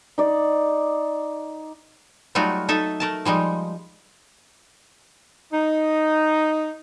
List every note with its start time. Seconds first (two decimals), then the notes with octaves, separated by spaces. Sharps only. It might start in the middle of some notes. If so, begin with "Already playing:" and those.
0.18 D#4 D5
2.35 F#3 G3 A3 D#4 F4 F#4
2.69 D#4 A4 E5
3.00 A3 A#4 A5
3.25 F3 G3 G#3 D#4
5.52 D#4